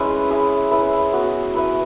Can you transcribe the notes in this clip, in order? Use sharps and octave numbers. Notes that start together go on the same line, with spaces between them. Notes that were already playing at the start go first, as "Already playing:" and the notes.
Already playing: G#3 C#4 E4 G#4 B4 E5
E4 G#4 E5
E4 B4 E5
B3 F#4 B4
E4 B4 E5